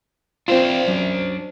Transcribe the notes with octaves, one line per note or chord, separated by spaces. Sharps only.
C4 D4 F4 C5 D5
F#2